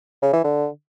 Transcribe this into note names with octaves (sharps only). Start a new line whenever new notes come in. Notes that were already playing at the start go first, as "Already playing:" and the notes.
C#3
E3
D3